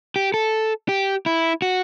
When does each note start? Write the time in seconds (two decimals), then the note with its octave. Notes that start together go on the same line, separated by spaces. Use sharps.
0.16 G4
0.34 A4
0.89 G4
1.26 E4
1.62 F#4